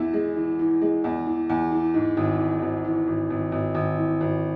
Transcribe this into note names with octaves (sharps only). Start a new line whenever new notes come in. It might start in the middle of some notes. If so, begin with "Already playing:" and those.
Already playing: E2 E4
G#3
E3
E3
G#3
E2
E3
E2
E3
G#2
G#1
E3
G#1
E3
G#1
G#1
G#1
G#1
E3
G#1